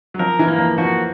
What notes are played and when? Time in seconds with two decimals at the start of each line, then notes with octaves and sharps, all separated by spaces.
0.14 F#3
0.19 F3 A#4
0.39 E3
0.48 A#3
0.58 F3
0.78 F3 F#4